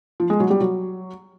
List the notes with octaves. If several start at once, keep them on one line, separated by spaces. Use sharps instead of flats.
F3
G#3
F#3
G3
F#3